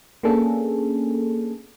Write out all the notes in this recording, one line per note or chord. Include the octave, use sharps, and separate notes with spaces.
A#3 B3 C#4 D4 G#4 A4